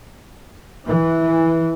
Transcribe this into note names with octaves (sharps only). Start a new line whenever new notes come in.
E3